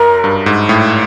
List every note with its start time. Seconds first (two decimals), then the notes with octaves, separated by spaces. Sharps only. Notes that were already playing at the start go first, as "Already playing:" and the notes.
Already playing: F#2 A#4
0.24 G2
0.46 G#2
0.69 A2